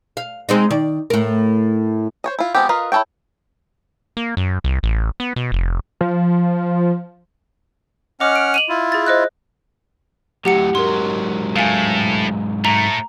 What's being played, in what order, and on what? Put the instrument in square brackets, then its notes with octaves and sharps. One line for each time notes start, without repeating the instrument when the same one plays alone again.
[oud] F5
G#3 C4 D#4
D#3 D5
A2 A#4
[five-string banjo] C5 C#5 D#5
E4 F4
F3 G#3 B3 C4 G4
F4 A#4 B4 D#5 F5
E4 F#4 A4 C#5 G5
[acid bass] A#3
F#2
C2
A1
B3
B2
F1
[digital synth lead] F3
[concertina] C#4 F#5 F6 [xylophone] D#5 D6
[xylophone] D7
D#7 F7 F#7
[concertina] E4 F4
[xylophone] G#4 A6
C5 D#5 F#6
[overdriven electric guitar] A2 F#3 [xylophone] G4 F#5 C#7
[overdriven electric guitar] G#2 F#3 [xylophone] A#4 C6
[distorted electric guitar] A2 [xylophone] F5 G#5
[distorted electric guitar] A2 A3 [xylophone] A#5